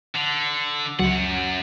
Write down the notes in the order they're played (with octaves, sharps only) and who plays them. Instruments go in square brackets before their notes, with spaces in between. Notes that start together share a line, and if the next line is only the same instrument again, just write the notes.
[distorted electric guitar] D3
[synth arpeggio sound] C#2 F#3 [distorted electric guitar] F#2 F#5